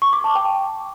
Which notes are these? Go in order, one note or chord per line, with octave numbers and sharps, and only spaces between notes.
C#6
D6
A5
G5